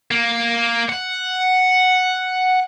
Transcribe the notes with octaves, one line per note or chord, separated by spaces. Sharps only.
A#3
F#5